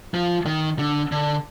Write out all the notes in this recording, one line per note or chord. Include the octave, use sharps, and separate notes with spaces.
F3
D#3
D3
D3